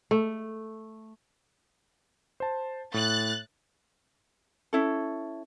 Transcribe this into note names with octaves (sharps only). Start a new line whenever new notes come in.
A3
C5 A5
A2 F#6 A6
C#4 E4 A4